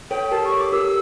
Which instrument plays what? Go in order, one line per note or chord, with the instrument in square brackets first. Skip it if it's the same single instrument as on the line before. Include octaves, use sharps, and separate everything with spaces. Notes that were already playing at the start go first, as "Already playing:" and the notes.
[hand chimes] A4 C#5 [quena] G5
[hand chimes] G4 A#4 [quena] A5
[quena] C#6
[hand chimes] A4 C#5
[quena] D6
[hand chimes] G4 A#4 [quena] E6